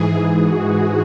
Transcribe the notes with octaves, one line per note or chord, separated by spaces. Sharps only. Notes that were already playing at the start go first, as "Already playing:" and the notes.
Already playing: G#2 E3 G#4
F#4